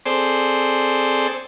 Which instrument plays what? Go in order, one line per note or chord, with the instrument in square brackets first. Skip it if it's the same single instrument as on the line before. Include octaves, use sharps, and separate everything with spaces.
[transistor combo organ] C4 G#4 A4 C5 D5